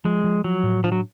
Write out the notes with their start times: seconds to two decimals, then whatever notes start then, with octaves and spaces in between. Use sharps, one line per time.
0.05 F3 G#3
0.24 F3
0.44 F3 F#3
0.63 A2
0.84 F3 D4
0.92 F#3